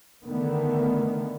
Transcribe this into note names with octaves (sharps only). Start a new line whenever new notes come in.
D3 D#3 A3 B3